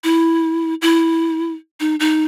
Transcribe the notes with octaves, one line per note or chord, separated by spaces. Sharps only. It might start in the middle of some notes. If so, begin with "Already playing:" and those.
E4
E4
D#4
D#4